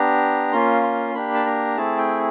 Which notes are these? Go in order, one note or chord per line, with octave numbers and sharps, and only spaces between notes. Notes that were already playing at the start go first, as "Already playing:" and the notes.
Already playing: B3 D4 G4 A#5
A#3 C#4 F4 C6
C6
A#3 D4 G4 B5
A5
A#5
A3 C4 E4 G#4 A5
G5